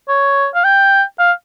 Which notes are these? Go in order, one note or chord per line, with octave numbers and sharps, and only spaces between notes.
C#5
F5
G5
F5